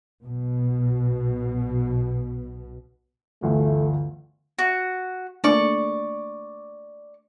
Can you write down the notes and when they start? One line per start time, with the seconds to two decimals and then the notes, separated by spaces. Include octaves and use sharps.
0.23 B1 B2
3.42 G1 D2 E3 A3
4.59 F#4
5.44 A3 A#3 D4 D5 C#6